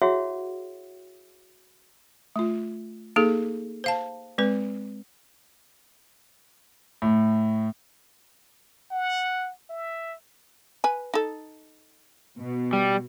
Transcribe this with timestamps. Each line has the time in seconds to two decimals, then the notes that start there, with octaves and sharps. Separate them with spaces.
0.02 E4 F#4 G#4 C#5 E5 F#5
2.36 A3 F4
3.16 A#3 D#4 G#4 A4
3.84 C5 F5 A5
4.38 G#3 C4 B4
7.02 A2
8.91 F#5
9.70 E5
10.84 B4 G#5
11.14 D#4 A4
12.39 B2
12.73 G3